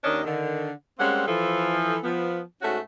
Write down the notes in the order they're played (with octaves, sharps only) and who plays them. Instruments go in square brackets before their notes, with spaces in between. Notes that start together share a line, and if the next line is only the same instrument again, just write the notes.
[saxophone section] D#2 D#3 C#4 D4 D#5
D3 D#3
G3 G#3 A#3 C4 C#4 F#5
E3 F3 A4
F3 B3
G#2 A3 C#4 F#4